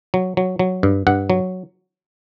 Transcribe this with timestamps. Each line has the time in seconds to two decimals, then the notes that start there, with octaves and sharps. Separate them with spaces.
0.14 F#3
0.37 F#3
0.59 F#3
0.83 G2
1.07 G2 F#5
1.30 F#3